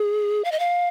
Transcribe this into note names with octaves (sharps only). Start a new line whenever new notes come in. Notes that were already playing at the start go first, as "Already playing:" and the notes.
Already playing: G#4
F5
D#5
F5